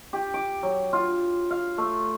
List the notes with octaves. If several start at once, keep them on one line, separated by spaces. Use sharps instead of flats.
G4
D6
F#3
F4
F5
A3